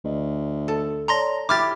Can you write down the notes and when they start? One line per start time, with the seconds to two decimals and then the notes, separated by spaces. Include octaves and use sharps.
0.05 D2 D#5
0.68 A4
1.08 C#5 D5 A5 A#5 C6 A#6
1.49 E4 G4 B5 D6 F6 A6